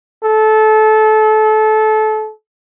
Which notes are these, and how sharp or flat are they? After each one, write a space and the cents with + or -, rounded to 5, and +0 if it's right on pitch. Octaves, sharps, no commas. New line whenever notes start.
A4 -25